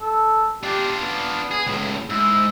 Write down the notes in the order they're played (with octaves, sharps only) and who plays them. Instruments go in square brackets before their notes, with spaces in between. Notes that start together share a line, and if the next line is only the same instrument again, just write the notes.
[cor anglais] A4
[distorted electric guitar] D4 F4 [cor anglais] G4
[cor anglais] B3
[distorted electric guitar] G#4
C#2 A2
[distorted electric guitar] G#2 [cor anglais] E4